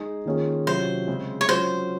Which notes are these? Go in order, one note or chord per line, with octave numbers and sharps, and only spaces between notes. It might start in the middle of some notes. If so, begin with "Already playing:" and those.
Already playing: G#3 D#4 G#4
D#3 A#3 C#4 F4 G#4
C3 F#3 C#4 F4 C5
C#3 G#3 C4
C#5
F#3 C#4 F4 C5